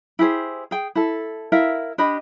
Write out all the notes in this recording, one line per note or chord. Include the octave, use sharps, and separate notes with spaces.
E4 G4 G#4 C5
G#4 G5
E4 A4
E4 A#4 E5 F5
D4 G4 D#5 B5